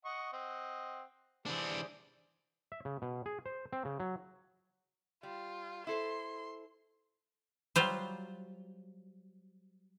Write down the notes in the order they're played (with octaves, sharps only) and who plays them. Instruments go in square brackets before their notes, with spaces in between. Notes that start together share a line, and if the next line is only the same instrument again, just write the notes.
[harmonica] D#5 F#5 C#6
C4 D#5 F#5
[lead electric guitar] E3 D4 [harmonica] G4 G#4 C5
[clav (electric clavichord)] E5
C#3
B2
G#4
C5
C4
C#3
F#3
[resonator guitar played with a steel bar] G3 [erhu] F4
[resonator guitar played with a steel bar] E4 A4 C5 [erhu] C6
[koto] F#3 G3 F4 C5